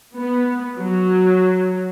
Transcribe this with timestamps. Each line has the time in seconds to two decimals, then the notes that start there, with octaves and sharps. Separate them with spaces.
0.16 B3
0.77 F#3